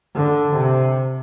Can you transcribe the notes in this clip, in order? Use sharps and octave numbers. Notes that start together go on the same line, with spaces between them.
D3
C3